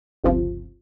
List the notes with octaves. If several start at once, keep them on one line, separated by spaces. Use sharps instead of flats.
G1 C#2 C3 F3